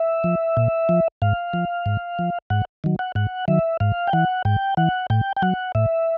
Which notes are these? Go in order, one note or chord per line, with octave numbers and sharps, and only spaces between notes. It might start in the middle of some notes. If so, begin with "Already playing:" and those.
Already playing: E5
F3
A#2
F3
G#2 F5
F3
G#2
F3
G#2 F#5
D#3 F#3
F#5
G#2 F#5
D#3 F#3 E5
G#2 F5
G5
E3 F#5
G#2 G5
E3 F#5
A2 G5
G5
F#3 F#5
A2 E5